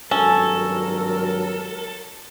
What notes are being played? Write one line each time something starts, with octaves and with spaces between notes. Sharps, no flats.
G#1 G2 F#3 C#4 A4 A#4